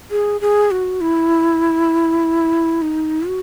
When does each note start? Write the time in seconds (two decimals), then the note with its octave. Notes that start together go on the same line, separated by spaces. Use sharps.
0.11 G#4
0.41 G#4
0.71 F#4
1.01 E4
2.82 D#4
3.27 F#4